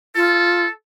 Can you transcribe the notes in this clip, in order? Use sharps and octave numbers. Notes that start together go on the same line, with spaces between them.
F4 A4